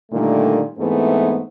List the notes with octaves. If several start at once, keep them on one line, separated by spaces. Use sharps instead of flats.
A#2 D3 D#3 G3 A3
G#2 E3 A3 B3 C4 G#4